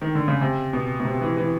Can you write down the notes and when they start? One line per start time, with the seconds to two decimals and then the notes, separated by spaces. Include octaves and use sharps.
0.02 D#3
0.15 D3
0.28 C#3
0.41 C3
0.73 B2
1.00 B2
1.05 C3
1.21 E3
1.36 E3